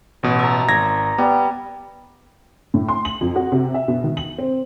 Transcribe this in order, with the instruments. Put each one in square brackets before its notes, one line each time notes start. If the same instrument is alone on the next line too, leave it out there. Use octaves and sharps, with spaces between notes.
[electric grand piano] A1 B2
[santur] E5 A5 A#5
[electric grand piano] G#1 G#6 A#6
[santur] G3 [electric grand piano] B3
[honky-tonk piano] A2
C6
F#7
F2
F#4
C3
E5
B2
D#3
F#7
C4